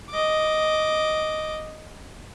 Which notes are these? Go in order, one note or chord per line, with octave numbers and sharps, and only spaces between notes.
D#5 D6